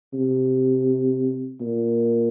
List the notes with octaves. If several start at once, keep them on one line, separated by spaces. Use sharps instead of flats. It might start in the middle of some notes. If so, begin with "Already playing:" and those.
C3
A#2